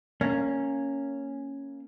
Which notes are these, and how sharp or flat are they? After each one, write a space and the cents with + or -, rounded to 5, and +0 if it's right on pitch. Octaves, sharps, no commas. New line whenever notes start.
A#3 -15 C#4 -5